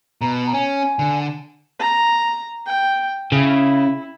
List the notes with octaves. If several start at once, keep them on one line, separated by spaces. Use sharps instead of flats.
B2 A#5
C#4 G#5
D3
A#5
G5
C#3 E4